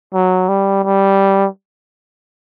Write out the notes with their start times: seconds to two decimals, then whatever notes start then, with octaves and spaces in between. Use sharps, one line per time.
0.14 F#3
0.49 G3
0.84 G3